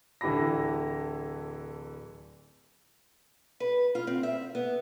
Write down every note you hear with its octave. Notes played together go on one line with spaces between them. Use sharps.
D1 D3 E3 G4 B5 A#6
B4
F4
C4
E5
B3